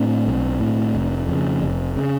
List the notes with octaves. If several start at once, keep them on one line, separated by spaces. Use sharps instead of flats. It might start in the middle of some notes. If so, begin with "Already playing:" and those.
Already playing: A2 C4 D4
B1
A2
F1
F2 C#3
F1
C#3